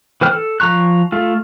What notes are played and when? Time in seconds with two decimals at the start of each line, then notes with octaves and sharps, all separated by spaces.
0.21 E3 B4 C5 G5 F6
0.33 A4
0.60 F3 A#5 C#6 F#6
1.12 A3 F4